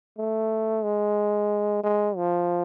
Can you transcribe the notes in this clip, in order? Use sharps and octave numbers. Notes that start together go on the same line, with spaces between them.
A3
G#3
G#3
F3